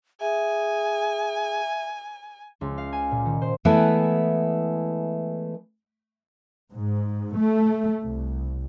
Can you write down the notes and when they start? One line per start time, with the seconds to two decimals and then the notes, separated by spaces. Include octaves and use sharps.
0.21 G#4 E5 G#5
2.61 C#2
2.78 F5
2.93 G#5
3.11 A#2
3.26 D#3
3.42 C5
3.65 E3 G#3 A3 B3 E4
6.72 G#2
7.37 A3
8.03 C2